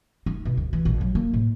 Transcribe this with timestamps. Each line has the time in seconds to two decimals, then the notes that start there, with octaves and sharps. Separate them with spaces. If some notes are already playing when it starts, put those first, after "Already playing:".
0.26 D#4
0.45 B2
0.57 D2
0.73 E3
0.85 A#1
1.01 F#3
1.15 A#3
1.34 A2